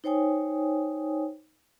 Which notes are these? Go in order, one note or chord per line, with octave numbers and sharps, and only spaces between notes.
D#4 C5 C#5 G5 G#5 D#6